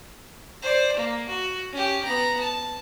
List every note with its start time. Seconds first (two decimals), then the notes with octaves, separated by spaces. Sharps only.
0.62 C5 D5
0.97 A#3
1.29 F#4
1.72 C#4 G4
2.04 B3 A#5
2.40 A5